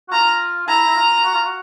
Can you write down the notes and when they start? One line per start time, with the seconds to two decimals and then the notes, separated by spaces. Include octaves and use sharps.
0.09 F#4
0.12 F4 A#5
0.67 E4 A#5
0.87 E4
0.96 F4
1.24 F#4
1.35 F4
1.45 F#4